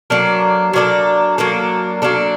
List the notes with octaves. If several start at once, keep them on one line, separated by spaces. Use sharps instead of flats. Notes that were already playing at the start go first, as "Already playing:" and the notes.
F#3 A#3 D4 A4
F#3 A#3 D4 A4
F#3 A#3 D4 A4
F#3 A#3 D4 A4